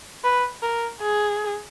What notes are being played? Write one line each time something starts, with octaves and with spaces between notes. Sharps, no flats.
B4
A#4
G#4